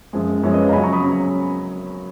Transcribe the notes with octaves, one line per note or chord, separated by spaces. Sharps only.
F#2 F3 G#3
F#2 F3 G#3 C#5
B4 D#5
C#5 F5
A#5
C#3 F#3 C#4 G#5 B5
A#5 C#6
B5 D#6
C#3 F#3 C#4